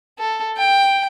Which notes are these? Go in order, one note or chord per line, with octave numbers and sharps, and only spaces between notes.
A4
G5